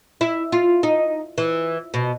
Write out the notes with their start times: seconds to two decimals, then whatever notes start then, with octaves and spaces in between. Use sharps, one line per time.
0.21 E4
0.52 F4
0.83 D#4
1.38 E3
1.94 B2